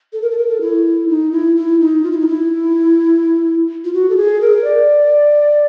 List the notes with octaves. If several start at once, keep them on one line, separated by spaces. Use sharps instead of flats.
A4
A#4
A4
A#4
A4
E4
D#4
E4
E4
D#4
F4
E4
D#4
E4
F4
F#4
A4
G#4
A#4
D5